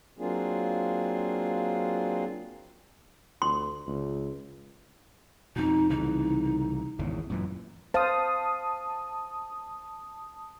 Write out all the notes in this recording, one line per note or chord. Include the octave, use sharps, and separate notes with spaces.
F#3 A#3 C4 D4 F4 G#4
D2 C6
C#2
F2 B2 D#4
C2 C#3 E3 D#4
G#1 E2 C#3
F#2 A#2 E3
C5 F5 A5 D#6